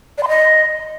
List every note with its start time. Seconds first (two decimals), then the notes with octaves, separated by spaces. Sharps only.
0.18 D5
0.23 C6
0.28 D#5